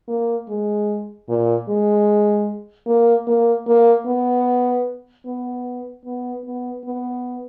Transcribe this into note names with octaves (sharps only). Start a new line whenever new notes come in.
A#3
G#3
A#2
G#3
A#3
A#3
A#3
B3
B3
B3
B3
B3